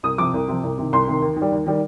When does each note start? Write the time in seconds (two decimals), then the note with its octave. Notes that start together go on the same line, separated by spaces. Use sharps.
0.03 C2 D#6
0.18 C3 F3 D6
0.34 C2
0.48 C3 F3
0.63 C2
0.78 C3 D#3
0.93 C2 C6
1.07 C3 D#3
1.22 D#2
1.36 D#3
1.42 G3
1.52 D#2
1.66 D#3 G3